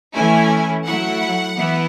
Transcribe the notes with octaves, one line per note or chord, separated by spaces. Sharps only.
E3 A3 C#4 E4 G#5
F#3 A3 E4 F#5
E3 B3 E4